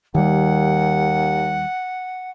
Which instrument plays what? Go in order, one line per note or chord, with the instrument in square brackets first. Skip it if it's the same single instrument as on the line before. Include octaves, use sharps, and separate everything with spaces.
[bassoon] D#2 [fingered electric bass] D#3 G3 [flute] F#5